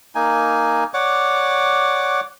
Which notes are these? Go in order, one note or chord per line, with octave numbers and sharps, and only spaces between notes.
A#3 D#4 G#5
C#5 D5 F#5 D6